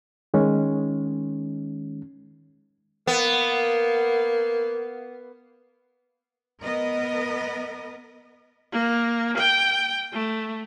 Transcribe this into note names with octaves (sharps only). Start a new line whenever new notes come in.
D#3 G#3 C#4
A#3 B3
B3 A#4 D#5
A#3
G5
A3